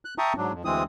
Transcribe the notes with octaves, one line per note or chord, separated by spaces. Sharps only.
F#6
E5 G5 A5 A#5 C#6 D#6
G#2 F#3 D4
F2
D2 E3 G#3 C4 D#6